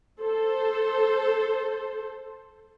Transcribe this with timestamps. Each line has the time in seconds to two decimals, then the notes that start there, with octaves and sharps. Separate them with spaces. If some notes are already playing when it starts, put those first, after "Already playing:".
0.21 A4 C5